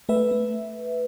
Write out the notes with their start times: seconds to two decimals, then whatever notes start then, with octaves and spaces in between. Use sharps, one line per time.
0.09 A3 B4 E5
0.31 A3